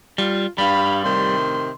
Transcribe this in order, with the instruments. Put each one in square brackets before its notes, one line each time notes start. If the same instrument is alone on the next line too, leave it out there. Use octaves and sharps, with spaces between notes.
[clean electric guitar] G3 [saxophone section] F4
[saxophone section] G2 [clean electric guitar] G3 [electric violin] F5 B5
[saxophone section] A2 C3 D#3 [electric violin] C6